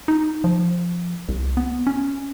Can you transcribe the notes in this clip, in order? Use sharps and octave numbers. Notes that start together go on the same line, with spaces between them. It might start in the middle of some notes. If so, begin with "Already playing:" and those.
D#4
F3
C2
B3
C#4